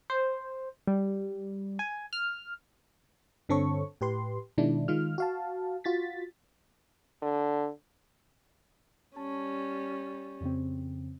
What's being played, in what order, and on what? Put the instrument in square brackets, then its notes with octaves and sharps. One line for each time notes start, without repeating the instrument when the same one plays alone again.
[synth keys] C5
G3
G#5
F6
[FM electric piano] G2 D3 C4 A4 C#5 C#6
A2 G4 B4 C6
B2 D#3 G#3 D4 E4
D#3 G#3 F4 F6
F#4 F5 A5
F4 F#4 A6 B6
[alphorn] D3
[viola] G3 C#4 [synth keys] A5
[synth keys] F2 C#3 C4